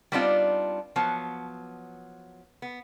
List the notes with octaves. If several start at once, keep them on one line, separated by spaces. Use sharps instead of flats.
G3 B3 C4 D4 D#4 F4
F3 F#3 B3
B3